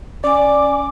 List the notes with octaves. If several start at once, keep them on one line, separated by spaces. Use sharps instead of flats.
C#4 D5 G#5 D6